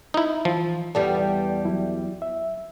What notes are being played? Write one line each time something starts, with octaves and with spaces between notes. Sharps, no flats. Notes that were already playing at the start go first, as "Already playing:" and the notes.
D#4 E4
E3 F3
E2 G3 B3 A4 D5 A5
F#3 E4
E5